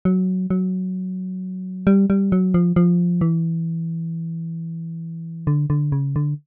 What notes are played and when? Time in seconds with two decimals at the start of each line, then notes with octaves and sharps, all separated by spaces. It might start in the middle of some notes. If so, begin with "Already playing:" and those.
0.05 F#3
0.50 F#3
1.87 G3
2.10 G3
2.32 F#3
2.54 F3
2.76 F3
3.21 E3
5.47 D3
5.70 D3
5.92 C#3
6.16 D3